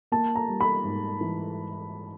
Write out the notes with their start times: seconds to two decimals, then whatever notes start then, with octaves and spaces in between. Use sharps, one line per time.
0.12 A#3 A5
0.35 A#5
0.48 G3
0.61 B5
0.85 G#2
1.21 E3